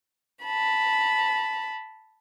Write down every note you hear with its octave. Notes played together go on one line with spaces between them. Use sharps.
A5 B5